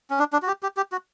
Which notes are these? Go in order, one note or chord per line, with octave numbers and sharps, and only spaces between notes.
C#4
D4
D4
F#4
G4
G4
G4
F#4